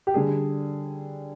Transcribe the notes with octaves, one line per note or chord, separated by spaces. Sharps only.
G4
D3 G3 D4 G#4